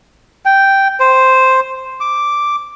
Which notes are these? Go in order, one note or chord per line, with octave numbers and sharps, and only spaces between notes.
G5
C5
D6